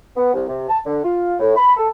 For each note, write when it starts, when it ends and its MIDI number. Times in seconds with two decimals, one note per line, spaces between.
0.17 0.31 59
0.34 0.44 36
0.48 0.66 48
0.69 0.80 81
0.86 1.00 50
1.04 1.35 65
1.40 1.56 45
1.57 1.74 83
1.77 1.89 69